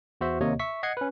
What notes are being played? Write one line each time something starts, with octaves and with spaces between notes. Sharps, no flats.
E2 F#4 C5 E5
D#2 C3 A#3 C#5 D#5
E5 C#6 B6
D#5 F#5 G#6 C7 C#7
C#4 B4